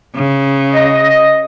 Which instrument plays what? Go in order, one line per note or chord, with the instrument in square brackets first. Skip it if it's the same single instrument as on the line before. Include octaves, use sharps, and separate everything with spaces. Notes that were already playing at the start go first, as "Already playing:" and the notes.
[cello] C#3
[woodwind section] D#5